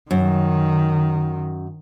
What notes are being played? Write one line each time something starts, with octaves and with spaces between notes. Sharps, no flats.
F#2 D#3